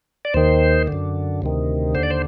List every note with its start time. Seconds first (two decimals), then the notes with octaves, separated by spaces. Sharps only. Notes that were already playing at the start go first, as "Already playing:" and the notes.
0.25 D5
0.34 D#2 D#3 C5
0.87 D3
0.92 F#2
1.42 D2 C3 D#3
1.95 D#2 D3 C5
2.03 D5
2.10 C5